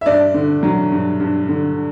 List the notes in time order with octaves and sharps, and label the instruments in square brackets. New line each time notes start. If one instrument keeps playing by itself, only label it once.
[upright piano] E5
G2 D5
D3
F#3
G2
G2
D3